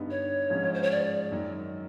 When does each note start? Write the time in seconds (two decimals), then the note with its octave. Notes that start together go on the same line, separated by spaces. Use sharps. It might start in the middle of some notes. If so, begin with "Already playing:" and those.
Already playing: G2 D3 G3 B3 D#4
0.11 C#5
0.50 G#2 F3 G#3 C#4
0.74 C5
0.83 C#5
0.91 D5
1.31 F#2 D#3 F#3